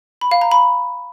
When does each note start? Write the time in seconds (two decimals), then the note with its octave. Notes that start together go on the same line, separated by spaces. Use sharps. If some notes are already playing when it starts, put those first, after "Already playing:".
0.21 B5
0.31 F5
0.41 A#5
0.51 B5